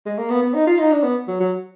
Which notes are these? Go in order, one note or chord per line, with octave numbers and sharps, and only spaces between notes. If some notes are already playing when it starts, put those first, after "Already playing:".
G#3
A#3
B3
B3
D#4
F4
D#4
D4
B3
F#3
F#3